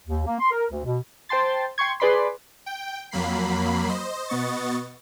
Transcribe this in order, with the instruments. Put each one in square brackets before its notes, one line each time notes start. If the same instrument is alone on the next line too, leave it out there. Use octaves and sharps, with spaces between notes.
[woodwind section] D#2
A#3
C6
A#4
D2
B2
[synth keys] C5 G5 A5 C6 A6
G5 C6 C#6 G#6
G#4 B4 D5 B5 C6
[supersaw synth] G5
F2 F#3 A#3 B5 C7
C5 D#5
B2 B3 D#5 C#6 A6